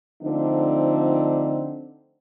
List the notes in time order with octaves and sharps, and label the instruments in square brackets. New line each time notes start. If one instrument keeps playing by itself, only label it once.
[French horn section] D3 F3 A3 C4 D4 D#4